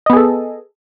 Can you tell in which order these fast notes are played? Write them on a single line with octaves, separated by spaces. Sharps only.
D#5 B3 G#4 A4